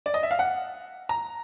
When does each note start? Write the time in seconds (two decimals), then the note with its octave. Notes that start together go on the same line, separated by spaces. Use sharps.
0.06 D5
0.14 D#5
0.23 E5
0.31 F5
0.39 F#5
1.09 A#5